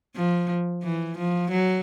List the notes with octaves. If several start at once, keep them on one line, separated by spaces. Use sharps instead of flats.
F3
E3
F3
F#3